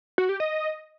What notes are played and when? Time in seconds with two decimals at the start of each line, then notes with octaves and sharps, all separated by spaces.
0.18 F#4
0.29 G4
0.40 D#5